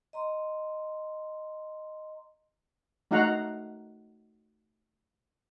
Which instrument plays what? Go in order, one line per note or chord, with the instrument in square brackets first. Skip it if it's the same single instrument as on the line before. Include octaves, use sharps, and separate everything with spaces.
[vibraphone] D#5 A#5 C6
[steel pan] A3 D#4 F#4 F5 F#5 A#5